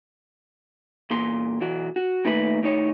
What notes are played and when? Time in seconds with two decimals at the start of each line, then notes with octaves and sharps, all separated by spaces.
1.10 E2 A#2 C6
1.60 B1 E3 F#4
1.96 F#4
2.25 A#2 D#3 A3 B4 E5 B5
2.61 D#2 A2 D#4 C#5